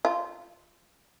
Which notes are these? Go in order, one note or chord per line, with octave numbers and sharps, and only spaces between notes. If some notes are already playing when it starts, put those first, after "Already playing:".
F4